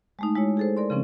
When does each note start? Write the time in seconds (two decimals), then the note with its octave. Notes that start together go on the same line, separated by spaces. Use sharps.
0.19 G#3 A3 D#4
0.36 G#3 E4 F#4 C#5
0.57 G#4 A4 C5
0.77 A#4 D5 C6
0.90 C#3 F3 C4 C#4